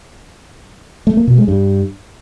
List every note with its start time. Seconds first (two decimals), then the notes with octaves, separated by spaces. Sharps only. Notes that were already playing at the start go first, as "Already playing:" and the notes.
1.07 A3
1.17 A#3
1.27 B2
1.38 G#3
1.48 G2